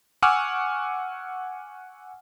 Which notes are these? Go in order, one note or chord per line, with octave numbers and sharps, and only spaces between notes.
F#5 G#5 C#6 D6 E6 F6